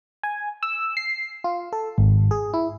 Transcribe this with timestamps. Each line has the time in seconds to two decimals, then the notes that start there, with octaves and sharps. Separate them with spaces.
0.23 G#5
0.63 E6
0.97 C7
1.44 F4
1.73 A4
1.98 G#1
2.31 G#4
2.54 E4